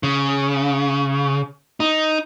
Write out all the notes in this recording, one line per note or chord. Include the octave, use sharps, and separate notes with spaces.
C#3
D#4